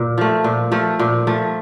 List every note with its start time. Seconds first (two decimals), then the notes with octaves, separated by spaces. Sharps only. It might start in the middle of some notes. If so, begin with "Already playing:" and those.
Already playing: A#2
0.18 F3 A3
0.44 A#2
0.72 F3 A3
0.99 A#2
1.27 F3 A3